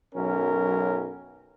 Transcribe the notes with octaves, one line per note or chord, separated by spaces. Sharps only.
B1 F#2 C#4 A#4